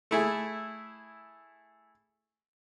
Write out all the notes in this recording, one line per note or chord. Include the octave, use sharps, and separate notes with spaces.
A3 E4 G#4